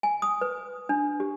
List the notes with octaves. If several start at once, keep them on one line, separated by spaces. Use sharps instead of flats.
G#5
D#6
B4
D4
G4